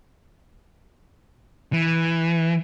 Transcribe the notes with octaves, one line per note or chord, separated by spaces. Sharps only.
E3